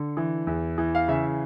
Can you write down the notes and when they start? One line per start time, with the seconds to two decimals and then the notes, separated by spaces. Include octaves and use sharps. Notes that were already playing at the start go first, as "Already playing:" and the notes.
Already playing: D3
0.17 E3
0.47 E2
0.78 E3
0.95 F5
1.08 C#3 E5